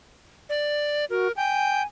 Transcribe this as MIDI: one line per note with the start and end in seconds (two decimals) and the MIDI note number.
0.49 1.05 74
1.10 1.28 66
1.10 1.32 70
1.36 1.82 79
1.36 1.86 80